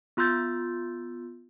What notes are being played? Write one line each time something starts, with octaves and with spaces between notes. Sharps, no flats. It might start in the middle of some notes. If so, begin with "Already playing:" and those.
B3 F4 C6 E6 G6 A6